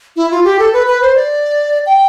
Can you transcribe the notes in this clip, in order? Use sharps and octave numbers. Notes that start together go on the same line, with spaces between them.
E4
F4
G4
A4
B4
B4
C5
D5
G5